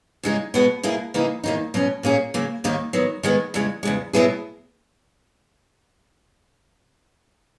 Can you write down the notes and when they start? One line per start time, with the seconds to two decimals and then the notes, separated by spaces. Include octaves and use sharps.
0.23 E2 C#3 G#3 D#4 G#4
0.54 B2 G#3 B3 F#4
0.83 B2 A#3 E4 G#4
1.14 C#3 E3 A#3 D#4 G#4
1.44 E2 D#3 F#3 A#3 D#4
1.74 B2 F#3 C#4
2.03 A#2 A#3 C#4 G#4
2.34 C#3 F#3 A#3
2.64 D#2 D#3 A#3 D#4
2.93 D#3 F#3 B3
3.23 D#3 G#3 B3
3.54 E2 C#3 G#3
3.83 E2 C#3 G#3
4.13 B2 F#3 B3 E4 G#4